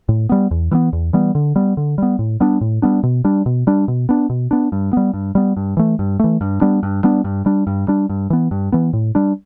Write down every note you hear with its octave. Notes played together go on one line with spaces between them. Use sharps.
A2
G3 B3
E2
E3 G3 B3
E2
E3 G3 B3
D3
G3 B3
D3
G3 B3
A2
G3 B3 D4
A2
G3 B3 D4
B2
G3 D4
B2
G3 D4
B2
B3 D4
B2
B3 D4
G2
G3 B3
G2
G3 B3
G2
E3 A3
G2
E3 A3
G2
G3 B3 D4
G2
G3 B3 D4
G2
G3 D4
G2
G3 D4
G2
E3 B3
G2
E3 B3
A2
G3 D4